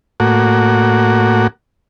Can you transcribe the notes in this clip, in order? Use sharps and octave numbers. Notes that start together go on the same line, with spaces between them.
A2 A#3 F#4